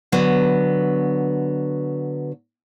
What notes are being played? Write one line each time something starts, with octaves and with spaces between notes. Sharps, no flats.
D3 F#3 B3